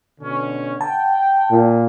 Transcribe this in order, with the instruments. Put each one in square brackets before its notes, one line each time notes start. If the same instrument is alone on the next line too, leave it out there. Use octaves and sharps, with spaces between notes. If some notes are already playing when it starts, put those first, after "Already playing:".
[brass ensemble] B2 D3 C#4
[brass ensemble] F#5 G5 [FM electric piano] A5
[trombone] A#2